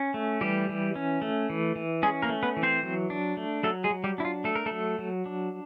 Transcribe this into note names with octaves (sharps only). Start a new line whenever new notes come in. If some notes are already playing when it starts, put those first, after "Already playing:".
Already playing: C#4
A3
E3 G3 G4
E3
C#4
A3
E3
E3
G#3 C#4 G#4
A#3 A#4
A3
B3 B4
E3
C4 C5
F#3
D4
A3
F#3 A3 A4
G#3 G#4
F#3
G3 G4
D4 E4
F4
A3 A4
A#4
F#3 A3 A4
F#3
D4